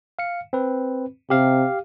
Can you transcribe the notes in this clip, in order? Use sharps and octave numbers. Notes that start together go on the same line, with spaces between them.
F5 C#7
C4 B4
C3 G4 F5